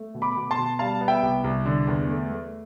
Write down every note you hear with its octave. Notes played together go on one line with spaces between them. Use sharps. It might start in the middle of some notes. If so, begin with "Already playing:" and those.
Already playing: A3
B2
B5 D6
B2
A5 C6
B2
G3 F5 A5
B3
E5 G5
C2
C2
D3
E2
A3
A3